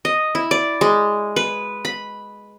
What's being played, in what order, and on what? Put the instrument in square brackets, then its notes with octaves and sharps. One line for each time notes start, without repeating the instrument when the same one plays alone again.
[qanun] D#5
E4
D5
G#3
B4
B5